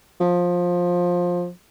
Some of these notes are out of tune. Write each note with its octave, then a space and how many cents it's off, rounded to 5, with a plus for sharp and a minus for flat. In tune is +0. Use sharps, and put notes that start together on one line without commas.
F3 +15